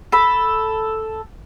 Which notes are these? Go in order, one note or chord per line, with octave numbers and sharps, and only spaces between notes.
A4 B5